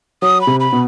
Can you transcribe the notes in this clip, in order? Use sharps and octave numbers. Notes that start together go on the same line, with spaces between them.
F#3 D#6
B5
C3
B5
B2